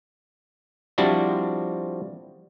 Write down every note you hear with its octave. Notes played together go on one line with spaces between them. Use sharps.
F3 G3 C4 D4 E4 F#4